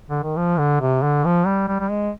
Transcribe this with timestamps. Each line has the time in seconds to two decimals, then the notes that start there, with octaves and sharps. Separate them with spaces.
0.09 D3
0.23 D#3
0.37 F3
0.58 D3
0.81 C3
1.02 D3
1.25 F3
1.46 G3
1.68 G3
1.80 G3
1.90 G#3